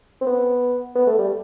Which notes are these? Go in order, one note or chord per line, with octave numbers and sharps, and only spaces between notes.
C4
B3
B3
A3
G3